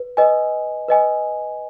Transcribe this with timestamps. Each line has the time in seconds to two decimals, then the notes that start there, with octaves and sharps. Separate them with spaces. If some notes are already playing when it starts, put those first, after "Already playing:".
Already playing: B4
0.17 B4 D#5 G#5
0.88 B4 D#5 G#5